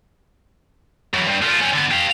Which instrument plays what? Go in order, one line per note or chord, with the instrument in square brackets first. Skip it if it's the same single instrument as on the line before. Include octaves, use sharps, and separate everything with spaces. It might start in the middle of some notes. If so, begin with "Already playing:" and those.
[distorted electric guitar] F#2 E3
G2
A3 F4
G3 C#4
D3 B3
G4 F5